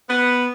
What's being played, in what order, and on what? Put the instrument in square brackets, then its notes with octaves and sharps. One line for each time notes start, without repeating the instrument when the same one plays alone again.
[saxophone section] B3